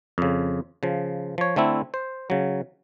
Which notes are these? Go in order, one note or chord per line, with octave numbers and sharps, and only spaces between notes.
F2 C#3
C#3 F3
F3 C#5
D3 A3 C4 E4
C5
C#3 F#3